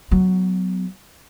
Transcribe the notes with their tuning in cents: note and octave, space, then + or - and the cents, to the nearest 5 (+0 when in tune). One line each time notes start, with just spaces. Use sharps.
F#3 +0 B3 +20